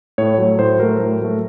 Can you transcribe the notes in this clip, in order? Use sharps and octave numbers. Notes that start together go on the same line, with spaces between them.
A2 C#5
F#3 A3
A2 C5
F#3 A3 A#4
A2
F#3 A3